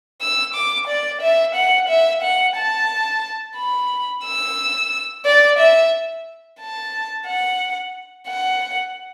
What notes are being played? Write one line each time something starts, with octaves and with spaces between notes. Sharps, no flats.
E6
D6
D5
E5
F#5
E5
F#5
A5
B5
E6
D5
E5
A5
F#5
F#5